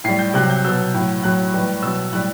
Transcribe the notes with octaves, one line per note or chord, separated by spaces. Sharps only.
A2 G3 C7
G6
C3 F#3 F#6
G6
B2 F#3 E6
A2 F#3
A2 F#3 F#6
A2 E3 G3
B2 F#3 E6
A2 G3 F#6